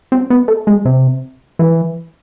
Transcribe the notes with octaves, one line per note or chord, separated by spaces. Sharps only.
C4
B3
A3
G#3
C3
E3